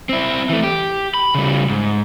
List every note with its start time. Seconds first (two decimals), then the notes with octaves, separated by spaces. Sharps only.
0.09 C4 E4
0.50 E3 A3
0.64 G4
1.14 B5
1.35 C#3 G3
1.70 G#2